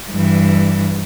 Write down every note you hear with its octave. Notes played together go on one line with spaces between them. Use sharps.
G2 E3